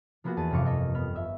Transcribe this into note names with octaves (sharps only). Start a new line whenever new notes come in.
F3 A#3 B3 F4 F#4 G#4
E2 G#4 A5 D#7
G1 F2 C3 F5 C#6 D6
A4 A#4 D#5
B3 F6
E5